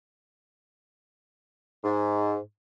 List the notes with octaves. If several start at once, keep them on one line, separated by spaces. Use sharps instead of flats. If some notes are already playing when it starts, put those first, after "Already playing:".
G#2